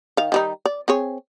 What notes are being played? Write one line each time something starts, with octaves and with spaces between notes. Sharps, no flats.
D#3 F5
D#3 G3 D#4
D5
C4 G#4 C#5